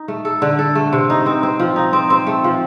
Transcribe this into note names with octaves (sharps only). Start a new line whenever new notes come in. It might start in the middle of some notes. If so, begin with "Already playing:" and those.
Already playing: D#4
A3
A4
D3
A4
A3
C3
D#4
C4
C4
F3
D#4
C4
C4
A3
F3